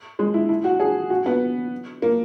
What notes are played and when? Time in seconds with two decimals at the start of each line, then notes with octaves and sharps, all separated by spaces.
0.19 G#3
0.34 E4
0.49 E4
0.64 F#4
0.80 G#4
1.10 F#4
1.26 B3
2.02 A#3